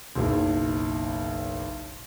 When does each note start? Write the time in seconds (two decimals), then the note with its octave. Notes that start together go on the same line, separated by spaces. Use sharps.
0.16 F#1 B1